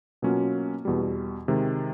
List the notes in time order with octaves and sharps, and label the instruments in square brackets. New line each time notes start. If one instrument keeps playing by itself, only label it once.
[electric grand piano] B2 F#3 A#3 C#4 F4
E2 B2 G3
C3 D#3 G#3